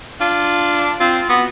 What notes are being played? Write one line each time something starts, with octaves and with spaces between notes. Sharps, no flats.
D4 F4
C4 F4
B3 F#4